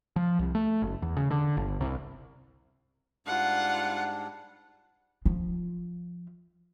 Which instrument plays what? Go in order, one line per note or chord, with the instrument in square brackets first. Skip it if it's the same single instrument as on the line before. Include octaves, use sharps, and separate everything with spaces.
[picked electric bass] F3
C2
A3
F#1
E2
C#3
D3
G1
C2
[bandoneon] G#2 G3 D4 [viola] F4 F#5
[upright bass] F3 F4